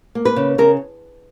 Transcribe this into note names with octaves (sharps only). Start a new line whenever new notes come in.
A#3
B4
C#3
C#3 A#4